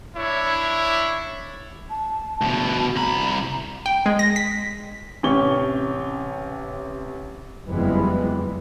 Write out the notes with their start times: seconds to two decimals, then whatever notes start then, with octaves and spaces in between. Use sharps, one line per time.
0.15 D4 E4 C#5
1.90 A5
2.41 D2 B2
2.96 C2 A#5 B5
3.86 G5
4.06 G#3
4.19 A#6
4.36 B6
5.23 A1 C3 C#4 C#6 G7
7.67 F#1 F2 E3 G3 G#3 B3